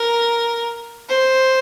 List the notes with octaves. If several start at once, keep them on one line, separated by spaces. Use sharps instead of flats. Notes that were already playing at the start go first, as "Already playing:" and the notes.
Already playing: A#4
C5